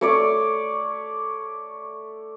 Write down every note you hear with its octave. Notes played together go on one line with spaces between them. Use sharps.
A3 C#5 D5